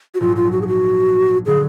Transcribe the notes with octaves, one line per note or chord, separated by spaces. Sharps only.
F#4
A#1 G#2 F#3 F4
F4
F#4
G#4
F#4
D3 F#3 G#4